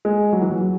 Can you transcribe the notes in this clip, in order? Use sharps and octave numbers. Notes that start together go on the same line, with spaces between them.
G#3
F#3
E3
F#3
F#3